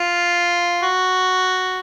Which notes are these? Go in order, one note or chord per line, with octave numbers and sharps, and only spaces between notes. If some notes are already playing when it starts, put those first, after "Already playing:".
Already playing: F4
F#4